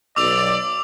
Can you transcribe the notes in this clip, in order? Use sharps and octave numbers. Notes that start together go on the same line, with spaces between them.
B1 D5 D6 E6 F7